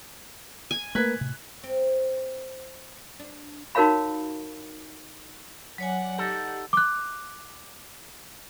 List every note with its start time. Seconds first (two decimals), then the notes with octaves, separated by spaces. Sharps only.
0.71 G#5
0.95 A3 A#3 A#4 B4 F#6 G#6 B6
1.21 A2 C3
1.63 C4
3.20 D4
3.75 D#4 F#4 A#4 C#5 F5 B5
5.78 F#3 C#5 D5 F#5 G#5
6.19 D#4 G4 A4
6.73 D6 F#6